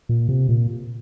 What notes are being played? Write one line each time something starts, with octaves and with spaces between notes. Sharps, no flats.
A#2
C3
A#2